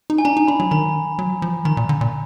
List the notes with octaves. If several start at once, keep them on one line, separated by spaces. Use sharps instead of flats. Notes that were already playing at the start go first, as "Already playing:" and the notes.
D#4
G#5
D4 A#5
D#4
D4 B5
F#3
D#3 A#5
F#3
F3
D#3 A#5
A#2
D3
A#2